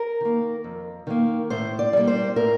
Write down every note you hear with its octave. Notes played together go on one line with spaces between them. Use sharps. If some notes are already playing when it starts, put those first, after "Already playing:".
Already playing: A#4
D#3 A#3
F2
D#3 A#3
A2 C5
D5
G3 A#3
C5
A2 A#4